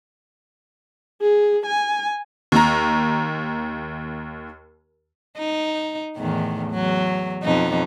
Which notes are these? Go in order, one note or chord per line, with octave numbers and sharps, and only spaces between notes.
G#4
G#5
D#2 A#5
D#4
E2 A2 D#3
E2 F#3
F2 B2 D#4